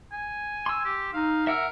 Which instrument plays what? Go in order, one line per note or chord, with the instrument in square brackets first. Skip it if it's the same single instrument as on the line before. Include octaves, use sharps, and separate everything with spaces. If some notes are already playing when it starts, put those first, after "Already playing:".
[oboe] G#5
[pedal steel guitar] C6 E6
[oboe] G4
[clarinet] D#4 [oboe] F5
[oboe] A#4 [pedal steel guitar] E5 F#5 E6